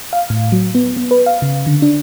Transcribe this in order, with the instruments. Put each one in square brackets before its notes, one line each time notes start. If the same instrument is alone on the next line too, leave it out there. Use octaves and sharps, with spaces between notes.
[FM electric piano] F5
A2
F#3
B3
B3
B4
F5
C#3
D3
D4